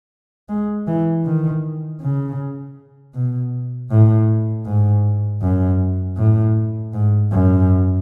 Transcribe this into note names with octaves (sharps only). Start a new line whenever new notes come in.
G#3
E3
D#3
C#3
B2
A2
G#2
F#2
A2
G#2
F#2